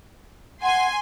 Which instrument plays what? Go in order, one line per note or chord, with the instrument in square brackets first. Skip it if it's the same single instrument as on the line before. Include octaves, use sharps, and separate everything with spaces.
[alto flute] F#5 [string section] G#5 C6